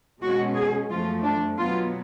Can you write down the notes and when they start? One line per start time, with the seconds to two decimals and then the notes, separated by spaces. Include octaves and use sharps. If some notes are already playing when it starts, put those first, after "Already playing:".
0.22 B2 G#3 C#4 F#4
0.56 G#4
0.90 F#2 F3 A3 F4
1.24 D4
1.58 B2 F#3 B3 F4